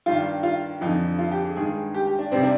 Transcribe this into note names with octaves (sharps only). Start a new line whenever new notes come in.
G2 D#3 G3 F4
F4
F2 D3 F3 D#4
F4
G4
G#4
G2 D#3 G#3 G#4
G4
G4
D4
C3 G3 C4
D4